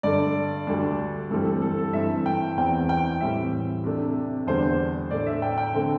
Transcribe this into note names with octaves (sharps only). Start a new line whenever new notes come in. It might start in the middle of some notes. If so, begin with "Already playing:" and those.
G2 D3 A3 D5
D2 D3 G3 D4
G2 E3 G3 C4 A4
A4
A4
A4
G2 E3 C4 E5
G5
E2 E3 C4 G5
G5
A2 E3 G3 C4 E5
C3 A3 D4
E2 D3 G3 D4 C5
A2 A3 D4 D5
E5
G5
G5
D3 A3 C4